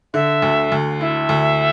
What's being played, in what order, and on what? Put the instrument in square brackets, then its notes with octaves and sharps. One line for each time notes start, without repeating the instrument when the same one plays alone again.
[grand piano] D3 [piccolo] E5
[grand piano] D2
D2
[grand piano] E4 [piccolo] E5
[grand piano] D2